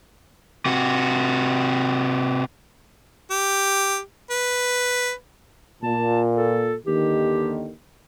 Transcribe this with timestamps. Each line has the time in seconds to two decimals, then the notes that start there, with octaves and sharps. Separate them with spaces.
0.66 C3 F#4
3.31 G4
4.31 B4
5.83 A#2 A5
6.36 A4
6.86 D#2 D3 D#3 G4